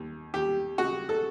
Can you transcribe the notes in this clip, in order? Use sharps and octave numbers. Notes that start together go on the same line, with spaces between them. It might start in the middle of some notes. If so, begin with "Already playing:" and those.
Already playing: D#2
D#2 G4
C#3 F#4
A4